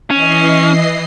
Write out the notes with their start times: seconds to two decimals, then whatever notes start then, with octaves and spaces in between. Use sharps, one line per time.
0.10 E3 C#4 D#5 C7